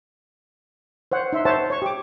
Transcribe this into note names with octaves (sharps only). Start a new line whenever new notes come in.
C5 C#5 F#5
D#4 E5 C6
C5 C#5 E5 F#5 A5
C#5 C#6
G4 D6